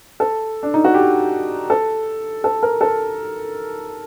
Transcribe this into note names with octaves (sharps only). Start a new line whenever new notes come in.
A4
D4
D#4
F#4
G4
A4
A4
A#4
A4